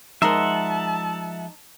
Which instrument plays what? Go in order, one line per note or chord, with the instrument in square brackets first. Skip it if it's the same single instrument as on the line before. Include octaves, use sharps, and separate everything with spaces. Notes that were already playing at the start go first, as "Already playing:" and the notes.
[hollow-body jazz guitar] F3 G#3 A#4 [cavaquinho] D#4 C6 [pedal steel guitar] E5 F#5 [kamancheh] A5